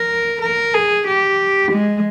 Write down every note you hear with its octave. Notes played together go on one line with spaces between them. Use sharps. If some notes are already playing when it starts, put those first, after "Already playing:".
Already playing: A#4
A#4
G#4
G4
G#3